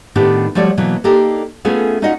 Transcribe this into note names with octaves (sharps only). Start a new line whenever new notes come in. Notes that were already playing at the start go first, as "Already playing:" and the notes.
A2 D#3 B3 D4 G4
F3 G3 A3 F#4 C#5 D5
B2 E3 F#3 A#3
A#3 D4 D#4 G4 A4 A#4
A3 B3 C#4 F4 G#4 A4
C#4 D#4 F4 F#4 D#5 F#5